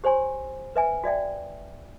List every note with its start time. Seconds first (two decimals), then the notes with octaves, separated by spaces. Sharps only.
0.04 G4 C5 C#5 G#5 C6
0.76 B4 E5 G#5
1.04 F#4 D5 E5 G5